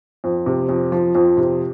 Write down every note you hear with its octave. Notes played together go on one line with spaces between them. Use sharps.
F2
C3
F2
F3
F2
C3